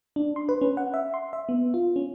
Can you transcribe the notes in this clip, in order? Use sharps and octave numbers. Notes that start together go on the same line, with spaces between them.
D4
C6
B4
C#4
F#5
E5
C6
E5
B3
F4
C#4